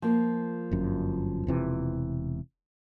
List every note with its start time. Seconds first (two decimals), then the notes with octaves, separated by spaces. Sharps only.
0.02 F3 A#3
0.71 G1 F#2
1.47 E1 C3 E3